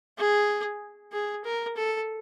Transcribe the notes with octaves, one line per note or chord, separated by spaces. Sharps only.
G#4
G#4
A#4
A4